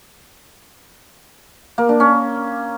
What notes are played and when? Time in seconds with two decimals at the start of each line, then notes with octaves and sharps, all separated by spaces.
1.78 A#3
1.89 D4
2.00 C#4